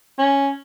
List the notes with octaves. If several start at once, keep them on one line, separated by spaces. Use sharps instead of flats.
C#4